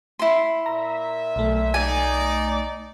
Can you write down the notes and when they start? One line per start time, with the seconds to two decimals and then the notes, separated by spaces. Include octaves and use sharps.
0.19 E4 C6
0.66 A#2 E5 A#5
1.36 B1 A3
1.74 D#4 D5 G#5